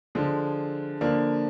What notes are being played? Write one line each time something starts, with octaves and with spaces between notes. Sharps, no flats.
D3 F3 G#3
D3 F3 A#3 D4